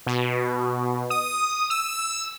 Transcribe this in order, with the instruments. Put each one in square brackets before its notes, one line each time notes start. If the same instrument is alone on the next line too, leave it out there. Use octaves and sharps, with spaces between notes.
[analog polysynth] B2
D#6
E6